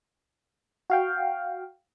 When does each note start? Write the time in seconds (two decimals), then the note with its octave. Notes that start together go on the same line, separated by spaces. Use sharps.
0.90 F#4 F5 G5